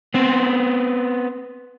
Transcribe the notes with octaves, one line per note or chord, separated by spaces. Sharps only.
B3 C4